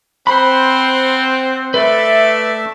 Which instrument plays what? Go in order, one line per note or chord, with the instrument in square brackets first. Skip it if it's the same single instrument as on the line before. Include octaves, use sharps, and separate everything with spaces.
[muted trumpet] C4 [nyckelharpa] C5 F#5 [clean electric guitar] B5
[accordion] A3 E5 [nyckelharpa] A4 D5 [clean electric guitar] B4